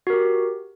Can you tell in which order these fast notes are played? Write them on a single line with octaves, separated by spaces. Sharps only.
F#4 A#4 G4